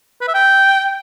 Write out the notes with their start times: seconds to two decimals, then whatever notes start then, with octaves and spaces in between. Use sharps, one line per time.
0.21 B4
0.28 E5
0.34 G5